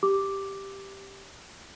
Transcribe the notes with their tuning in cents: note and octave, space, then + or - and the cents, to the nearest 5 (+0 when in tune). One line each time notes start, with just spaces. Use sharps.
G4 +0 D6 +0